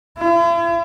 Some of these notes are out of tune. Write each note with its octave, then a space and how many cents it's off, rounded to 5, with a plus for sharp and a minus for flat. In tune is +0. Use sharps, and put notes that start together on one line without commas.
E4 +45